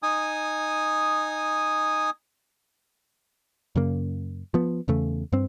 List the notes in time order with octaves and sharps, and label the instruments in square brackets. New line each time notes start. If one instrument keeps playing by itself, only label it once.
[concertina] D#4 G#5 D#6
[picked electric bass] F#2 C#3 A#3
F3 B3
E2 C#3 A3
G2 C4